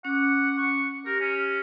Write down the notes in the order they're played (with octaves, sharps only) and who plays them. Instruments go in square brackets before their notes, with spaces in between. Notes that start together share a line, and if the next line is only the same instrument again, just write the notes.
[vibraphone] C#4 D6 [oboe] F#5
[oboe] C#6
[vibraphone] G4 [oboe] A#4
[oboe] C#4